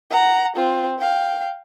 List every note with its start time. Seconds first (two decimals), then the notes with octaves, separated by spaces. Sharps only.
0.10 F#5 A#5
0.56 C4 F4
0.99 F5 G5